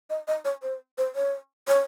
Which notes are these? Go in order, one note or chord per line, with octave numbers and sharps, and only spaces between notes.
D#5
D#5
C#5
C5
C5
C#5
C#5